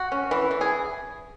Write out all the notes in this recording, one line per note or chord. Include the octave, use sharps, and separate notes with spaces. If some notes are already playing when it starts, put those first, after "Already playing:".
Already playing: F#4
C#4
E3
E3
G#4